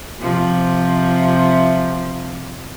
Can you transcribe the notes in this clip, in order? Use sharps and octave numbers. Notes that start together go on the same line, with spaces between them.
C3 F3